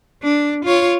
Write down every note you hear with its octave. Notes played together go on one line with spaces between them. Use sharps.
D4
F4 C#5